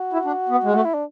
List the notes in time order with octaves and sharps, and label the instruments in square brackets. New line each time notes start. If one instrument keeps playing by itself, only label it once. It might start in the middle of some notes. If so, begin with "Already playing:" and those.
Already playing: [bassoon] F#4
[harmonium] E4
D4
B3
G#3
[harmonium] A3 [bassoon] F#4
[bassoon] E4
D4